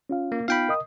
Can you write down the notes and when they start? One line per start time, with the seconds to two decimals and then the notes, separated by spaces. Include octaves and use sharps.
0.09 C#4 F4 F5
0.32 A#3
0.48 B3 D#4 F4 F5 G5 B5
0.68 A#4 D#5 D#6